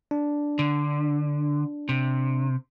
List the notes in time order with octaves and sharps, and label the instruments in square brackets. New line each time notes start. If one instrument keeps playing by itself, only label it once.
[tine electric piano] D4
[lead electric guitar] D3
C3